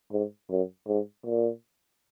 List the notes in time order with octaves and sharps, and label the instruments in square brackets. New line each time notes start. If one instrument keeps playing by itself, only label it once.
[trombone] G#2
F#2
G#2
A#2